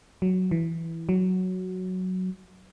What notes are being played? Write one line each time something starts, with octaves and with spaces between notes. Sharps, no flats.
F#3
E3
F#3